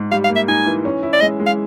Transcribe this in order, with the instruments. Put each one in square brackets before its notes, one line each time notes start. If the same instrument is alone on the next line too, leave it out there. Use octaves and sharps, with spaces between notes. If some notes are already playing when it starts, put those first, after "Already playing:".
Already playing: [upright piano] G#2
[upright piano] G3 [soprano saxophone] F5
[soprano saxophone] F5
[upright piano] A#3
[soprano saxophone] E5
[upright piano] D#4 [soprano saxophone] G#5
[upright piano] E3
C#4
E4
[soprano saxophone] D5
[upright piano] G#3 [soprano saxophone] D#5
[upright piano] G#3
[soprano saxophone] F5